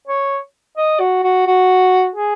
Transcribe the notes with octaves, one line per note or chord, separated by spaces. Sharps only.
C#5
D#5
F#4
F#4
F#4
G#4